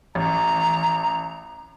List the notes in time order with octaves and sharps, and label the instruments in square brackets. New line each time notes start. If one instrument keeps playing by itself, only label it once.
[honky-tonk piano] A1 [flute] A#5